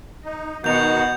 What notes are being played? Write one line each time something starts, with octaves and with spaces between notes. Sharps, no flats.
D#4 D#5
B2 D#3 D#4 F#4 F#5 G6 F7